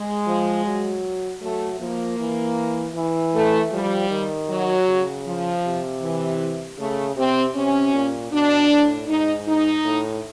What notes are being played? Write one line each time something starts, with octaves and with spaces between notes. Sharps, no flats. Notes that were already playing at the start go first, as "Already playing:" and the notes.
Already playing: G#3
F3
F#3
F#3 A3
F3 A#3
E3
E3
A3
F3 G3
D#3
F#3
C#3
F3
C3
E3
C#3 A3
C3 C4
C3 C#4
A#2
B2 D4
A2
G#2 D#4
D#4
A2